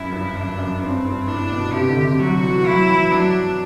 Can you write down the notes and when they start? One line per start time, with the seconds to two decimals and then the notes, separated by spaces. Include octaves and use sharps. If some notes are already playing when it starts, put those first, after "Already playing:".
Already playing: F#2 E4
0.12 G2
0.35 F#2 D4
0.58 F#2
0.82 G2 C4
1.05 G2
1.27 A2 D4
1.51 B2
1.73 C3 G4
1.89 D3
2.04 C3
2.19 F#3 F#4
2.43 E3
2.66 F#3 E4
2.89 E3
3.11 F#3 D4